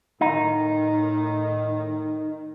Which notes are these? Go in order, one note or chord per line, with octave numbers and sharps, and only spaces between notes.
A2 D#3 D#4